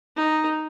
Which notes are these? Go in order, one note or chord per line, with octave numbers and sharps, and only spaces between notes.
D#4